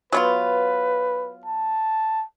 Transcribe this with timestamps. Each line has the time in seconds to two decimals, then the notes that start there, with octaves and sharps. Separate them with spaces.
0.12 F#3 B3 F4 B4
1.45 A5